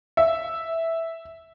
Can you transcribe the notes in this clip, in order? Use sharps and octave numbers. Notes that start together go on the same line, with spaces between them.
E5